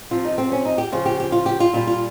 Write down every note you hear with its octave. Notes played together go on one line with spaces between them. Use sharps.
C3 F3 F4
D#4
C4
C#4
D#4
G4
C#3 F3 F4
G4
G4
F4
G4
F4
A#2 G3 F4
F4